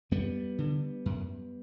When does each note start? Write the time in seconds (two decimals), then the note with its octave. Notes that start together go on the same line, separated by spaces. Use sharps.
0.11 F#2 G3 B3
0.58 D3
1.06 F#2